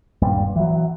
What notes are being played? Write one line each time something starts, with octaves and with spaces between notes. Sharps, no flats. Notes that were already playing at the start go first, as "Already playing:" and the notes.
D#1 G2 A#2 G3
E3 F#3